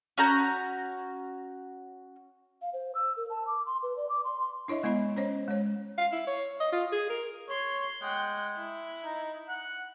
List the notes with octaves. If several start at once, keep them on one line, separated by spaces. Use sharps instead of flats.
C#4 F#4 A#5 G6
F5
C5
E6
A#4
A5
D6
C6
B4
D5
D6
C6
C6
D4 E4 C#5 D#5 E5
G#3 B3 E4 D#5 B5
C#4 C5 C#5 D#5
G#3 C#5
F5
E4
C#5
D#5
F4
G#4
A#4
C#5 C6
G#3 F#5 G5
E4
D#4
F#5